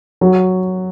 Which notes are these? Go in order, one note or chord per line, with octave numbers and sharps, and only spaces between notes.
F#3